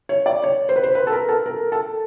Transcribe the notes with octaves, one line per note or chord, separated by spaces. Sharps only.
C#5
D5
C#5
C5
B4
C5
B4
A4
A#4
A4
A#4
A4